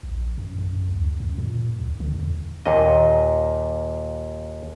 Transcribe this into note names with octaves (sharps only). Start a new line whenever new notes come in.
A#1
F#2
F#2
D2
F#2
A#2
C#2
D3
E2
D#2 A#2 D#5